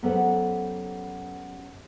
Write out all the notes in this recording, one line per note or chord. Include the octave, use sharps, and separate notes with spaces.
F#2 B3 G4 A4 C5 F#5